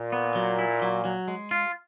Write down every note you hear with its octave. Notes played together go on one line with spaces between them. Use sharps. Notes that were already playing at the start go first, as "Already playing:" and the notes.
Already playing: A#2
B3
F#3
E4
F#3
F#3
G#3
F4